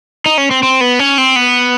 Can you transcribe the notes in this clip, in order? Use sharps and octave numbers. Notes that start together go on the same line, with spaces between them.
D#4
C#4
C4
C4
B3
C#4
C4
B3